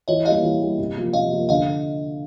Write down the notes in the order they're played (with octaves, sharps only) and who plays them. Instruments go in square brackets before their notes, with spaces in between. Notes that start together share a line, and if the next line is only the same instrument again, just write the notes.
[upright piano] E3 [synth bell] C#5 D#5
[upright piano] G3 A#3 [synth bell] D#5 F5
[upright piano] E3
G3 A#3
C3
F3 A#3
[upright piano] C3 [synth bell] D#5 F5
[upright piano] F3 A#3
[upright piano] D3 [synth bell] D#5 F5